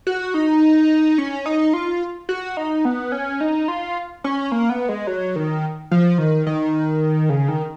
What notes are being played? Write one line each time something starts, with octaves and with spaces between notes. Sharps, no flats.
F#4
D#4
C#4
D#4
F4
F#4
D#4
B3
C#4
D#4
F4
C#4
A#3
B3
G#3
F#3
D#3
F3
D#3
D#3
C#3
D#3